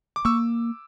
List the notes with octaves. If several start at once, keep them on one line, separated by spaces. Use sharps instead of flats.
D6
A#3 C#6 E6